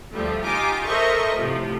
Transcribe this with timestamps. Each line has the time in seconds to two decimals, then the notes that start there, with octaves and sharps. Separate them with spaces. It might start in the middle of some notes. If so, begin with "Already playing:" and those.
0.11 D2 F3 G3 A3
0.43 D#4 F4 G4 G#5 D6
0.85 A4 A#4 C5 D#5 E5 C#6
1.34 A2 C3 F3 A3 G4